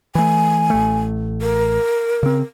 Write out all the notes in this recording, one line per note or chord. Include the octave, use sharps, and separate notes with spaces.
E3 A3 G#5
A1 A3
A#4
C#3 C4